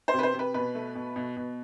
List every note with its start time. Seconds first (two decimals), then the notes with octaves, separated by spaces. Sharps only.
0.08 C5
0.13 C3
0.19 B4
0.23 C5
0.34 C3
0.39 B4
0.54 B2 B4
0.75 A3
0.95 B2
1.16 B2
1.37 B2